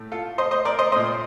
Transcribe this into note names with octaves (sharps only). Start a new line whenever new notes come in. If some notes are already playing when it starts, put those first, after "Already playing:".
Already playing: A2 A3
F4 A4
C5 D#5
C5 D#5
A#4 D5
C5 D#5
A#2 A3 C5 D#5